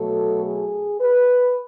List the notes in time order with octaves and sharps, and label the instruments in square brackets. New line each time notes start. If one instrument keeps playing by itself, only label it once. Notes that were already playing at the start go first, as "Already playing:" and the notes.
Already playing: [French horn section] B2 F#3 A3 A4
G#4
B4